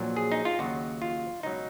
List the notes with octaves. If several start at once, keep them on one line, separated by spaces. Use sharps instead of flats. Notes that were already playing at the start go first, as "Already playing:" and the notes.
Already playing: A#1 A#2 F#3
G#4
D#4
F4
D#2 C#3 F#3 F#4
F4
C#2 B2 F#3 D#4